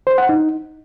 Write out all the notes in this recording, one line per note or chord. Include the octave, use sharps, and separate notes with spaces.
C5
F#5
D#4